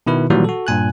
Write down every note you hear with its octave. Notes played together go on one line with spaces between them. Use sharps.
B2 D#3 E4 B4
A#2 D#3 E3 F#3 G3 F#4
F#4 A4
G2 A#2 G#5 F#6